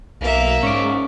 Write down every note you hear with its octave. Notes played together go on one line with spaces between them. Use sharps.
B1 A#3 E5
G#2 C#4 D5